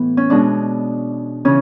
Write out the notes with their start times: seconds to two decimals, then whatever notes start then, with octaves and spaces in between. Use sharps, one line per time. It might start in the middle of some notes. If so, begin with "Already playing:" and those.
Already playing: A2 E3 B3
0.17 C#4
0.30 B2 G#3 B3 D4
1.45 C#3 E3 C#4